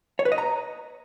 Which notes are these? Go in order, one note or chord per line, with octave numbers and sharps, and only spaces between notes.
C#5
B4
D#5
A#5